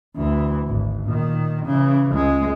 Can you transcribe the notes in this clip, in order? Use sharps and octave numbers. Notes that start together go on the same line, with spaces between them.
D2 E3
G#1
A#2 D#3
C#3 E3
C#2 G#3